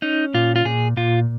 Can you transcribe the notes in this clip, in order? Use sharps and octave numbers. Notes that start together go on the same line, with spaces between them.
C#4 D#4
A#2 F4
F4
A#2 G#4
A#2 F4